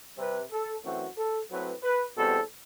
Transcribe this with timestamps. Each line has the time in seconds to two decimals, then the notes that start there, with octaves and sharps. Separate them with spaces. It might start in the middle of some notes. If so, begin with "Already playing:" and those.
0.17 C3 G3 C4 B4
0.51 A4
0.84 F#2 E3 A3 C4 F#4
1.18 A4
1.50 A2 F#3 C4 B4
1.83 B4
2.16 E2 B2 G3 C4 A4